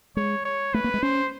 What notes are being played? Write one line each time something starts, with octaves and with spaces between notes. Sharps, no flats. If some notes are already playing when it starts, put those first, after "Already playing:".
G#3 C#5
C#5
A3 B4
A#3
G#3
C#4 C5